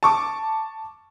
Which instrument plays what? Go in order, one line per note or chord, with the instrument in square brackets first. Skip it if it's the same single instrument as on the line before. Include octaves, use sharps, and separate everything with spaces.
[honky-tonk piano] A5 C#6 D6